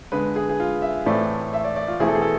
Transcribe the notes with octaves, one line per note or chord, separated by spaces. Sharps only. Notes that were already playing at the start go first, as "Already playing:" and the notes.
D3 G#3 B3 B4
G#4
G#4
F4
E5
A2 E3 A3 C4 D5
E5
D5
D5
F4
E2 B2 A3 C4 E4 G#4
A4
G#4
A4